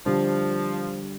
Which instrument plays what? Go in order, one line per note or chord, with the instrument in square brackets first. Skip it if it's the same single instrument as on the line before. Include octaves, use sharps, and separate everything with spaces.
[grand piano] D3 G3 D4 [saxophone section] F3